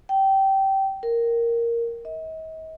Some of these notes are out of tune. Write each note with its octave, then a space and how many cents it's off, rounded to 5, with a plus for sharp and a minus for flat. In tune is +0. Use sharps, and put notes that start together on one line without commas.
G5 -20
A#4 +0
D#5 +45